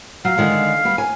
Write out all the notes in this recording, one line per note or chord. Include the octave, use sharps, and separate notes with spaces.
F#3 F5
D3 D#3 G#3
G3 B3
G#5